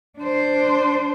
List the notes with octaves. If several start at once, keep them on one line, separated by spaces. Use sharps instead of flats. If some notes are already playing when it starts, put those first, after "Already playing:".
D4 C5